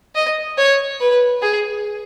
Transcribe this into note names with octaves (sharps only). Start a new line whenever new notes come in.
D#5
C#5
B4
G#4